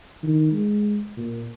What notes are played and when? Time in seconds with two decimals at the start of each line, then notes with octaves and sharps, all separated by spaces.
0.23 D#3
0.52 G#3
1.17 A#2